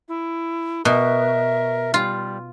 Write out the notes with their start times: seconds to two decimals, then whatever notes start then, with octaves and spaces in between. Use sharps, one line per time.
0.08 E4
0.85 B2 A#4 E5
1.94 G3 F4